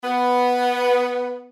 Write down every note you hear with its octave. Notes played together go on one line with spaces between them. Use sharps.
B3